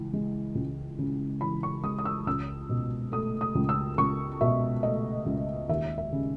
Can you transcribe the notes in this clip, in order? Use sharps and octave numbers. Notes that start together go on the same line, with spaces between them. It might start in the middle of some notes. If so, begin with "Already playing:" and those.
Already playing: C#2 E3
G#3
C#2
C#3
E3 B5
C#6
G#3 D#6
D#6
E6
C#2 E6
B2
A3 D#6
D#6
C#2
E6
C#2 C#6
B2 E5
A3 D#5
C#2
D#2 E5
E5
C#3